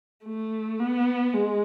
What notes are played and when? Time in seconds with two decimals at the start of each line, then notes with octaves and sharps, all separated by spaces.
0.25 A3
0.79 B3
1.34 G#3